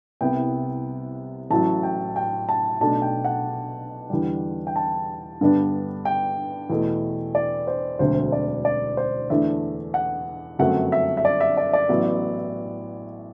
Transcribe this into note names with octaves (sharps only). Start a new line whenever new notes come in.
C2 C3 G3 B3 E4 G5
A1 A2 F#3 A5
G5
G5
A5
B1 B2 A3 D4 A5
G5
F#5
E2 D3 G3
G5
A5
G2 D3 G3 B3 D4
G5
E2 B2 A3 E4
D5
C5
E1 D2 D3 F#3 C4 C5
D5
D5
C5
E2 D3 A3 D4 E5
F#5
G1 F#2 F#3 A3 C4 F#5
E5
E5
D5
E5
D5
D5
A1 A2 F#3 B3 E4